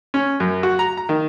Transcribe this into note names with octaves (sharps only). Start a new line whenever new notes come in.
C#4
F#2
F#4
A#5
A#5
D#3